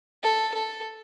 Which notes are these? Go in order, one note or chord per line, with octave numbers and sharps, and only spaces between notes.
A4
A4